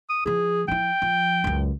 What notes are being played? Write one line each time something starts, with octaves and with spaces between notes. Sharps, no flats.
D#6
F3 E4 G#4
F3 E4 G5
F3
C#2 F#2